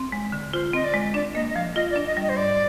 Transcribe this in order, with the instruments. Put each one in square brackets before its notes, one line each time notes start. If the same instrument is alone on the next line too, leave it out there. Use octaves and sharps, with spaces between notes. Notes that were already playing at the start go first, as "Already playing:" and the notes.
Already playing: [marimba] C4
G#3
D3
[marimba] F4 [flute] C5
[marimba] C4 [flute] D#5
[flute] D5
[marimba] G#3
[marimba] D4 [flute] D5
[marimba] A#3 [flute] D#5
[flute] D#5
[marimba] F3 [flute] F5
[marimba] F4 [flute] D#5
[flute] D5
[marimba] D4
[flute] D#5
[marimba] G3
[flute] D#5
C5
[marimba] G#2 [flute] D5